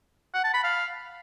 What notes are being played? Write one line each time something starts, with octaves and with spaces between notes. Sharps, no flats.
F#5
A5
B5
F5